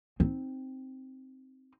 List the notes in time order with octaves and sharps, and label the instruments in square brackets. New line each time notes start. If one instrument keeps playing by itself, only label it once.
[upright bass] C4 D#4